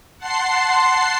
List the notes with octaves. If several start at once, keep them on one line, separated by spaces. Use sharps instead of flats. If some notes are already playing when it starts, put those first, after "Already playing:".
F#5 A5 C6 C7